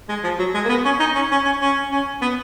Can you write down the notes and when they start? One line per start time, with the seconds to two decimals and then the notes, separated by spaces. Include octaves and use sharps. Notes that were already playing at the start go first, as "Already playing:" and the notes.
0.09 G#3
0.24 F3
0.39 F#3
0.55 G#3
0.65 A#3
0.69 B3
0.85 C#4
1.00 D#4
1.15 C#4
1.31 C#4
1.45 C#4
1.61 C#4
1.92 C#4
2.22 B3